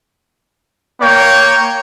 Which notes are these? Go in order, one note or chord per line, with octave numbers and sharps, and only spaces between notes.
A#3 C#5 G5